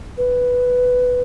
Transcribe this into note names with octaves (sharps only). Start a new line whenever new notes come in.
B4